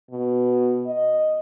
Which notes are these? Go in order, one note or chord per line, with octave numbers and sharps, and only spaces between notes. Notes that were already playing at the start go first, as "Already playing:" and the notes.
B2
D#5